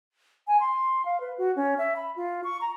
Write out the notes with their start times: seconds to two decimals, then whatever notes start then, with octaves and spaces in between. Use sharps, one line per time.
0.47 G#5
0.60 C6
1.05 F5
1.20 B4
1.38 F#4
1.56 C#4
1.78 E5
1.96 B5
2.16 F4
2.44 C#6
2.61 A#5